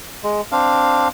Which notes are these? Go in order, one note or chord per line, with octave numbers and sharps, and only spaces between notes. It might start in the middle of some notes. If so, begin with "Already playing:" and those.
G#3
C4 D4 F5